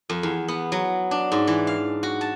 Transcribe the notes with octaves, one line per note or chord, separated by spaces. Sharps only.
F2
E2
B3
F#3
D4
G#2
E3
F5
F#4
A5